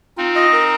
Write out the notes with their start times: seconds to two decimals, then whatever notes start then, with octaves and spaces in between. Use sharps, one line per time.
0.17 C4 D#4 F4
0.36 D#5
0.53 A#4